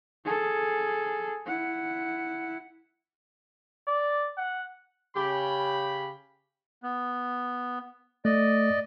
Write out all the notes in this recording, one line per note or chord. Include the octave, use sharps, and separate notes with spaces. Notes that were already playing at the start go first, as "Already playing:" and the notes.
G#4 A4
E4 F#5
D5
F#5
C#3 G4 B5
B3
A3 D5 D#5